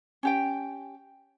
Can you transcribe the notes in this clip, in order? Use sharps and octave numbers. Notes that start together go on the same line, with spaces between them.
C#4 G4 G5